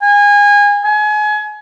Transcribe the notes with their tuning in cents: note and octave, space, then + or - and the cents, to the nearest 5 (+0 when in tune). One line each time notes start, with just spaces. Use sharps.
G#5 -25
G#5 +30